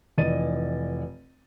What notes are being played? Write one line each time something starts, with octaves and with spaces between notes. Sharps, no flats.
F1 E3 D5 D#5 A6 D#7